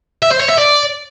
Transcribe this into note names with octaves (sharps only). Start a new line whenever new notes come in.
E5
C5
C#5
E5
D5